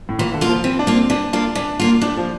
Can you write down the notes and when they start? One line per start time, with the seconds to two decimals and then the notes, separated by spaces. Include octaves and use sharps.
0.09 A2
0.19 A#2 E3
0.34 D3
0.41 A#3 F4
0.49 F3
0.64 E3 C4
0.79 D4
0.87 A#3 F4
0.95 C4
1.10 E3 D4
1.33 A#3 D4 F4
1.55 E3 D4
1.80 A#3 F4
2.01 A2 D4
2.17 F3